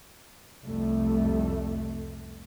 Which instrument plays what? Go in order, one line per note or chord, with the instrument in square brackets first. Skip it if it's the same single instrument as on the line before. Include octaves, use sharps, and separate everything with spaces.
[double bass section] C2 F2 G3 A3